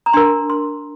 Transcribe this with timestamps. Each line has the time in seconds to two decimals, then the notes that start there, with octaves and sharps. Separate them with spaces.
0.06 A#5
0.13 D4 A#4 C6
0.50 C6